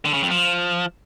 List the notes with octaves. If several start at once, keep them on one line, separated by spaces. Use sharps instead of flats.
D3
C#3
F2
F3